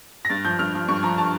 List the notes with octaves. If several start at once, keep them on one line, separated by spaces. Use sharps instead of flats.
A#6
G2 A6
F3 G6
G2 F6
F3
G2 C#6
F3 A#5
A5